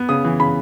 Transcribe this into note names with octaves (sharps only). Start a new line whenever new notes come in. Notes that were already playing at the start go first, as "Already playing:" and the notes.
Already playing: B3
C#3 D#6
E3
C#3 B5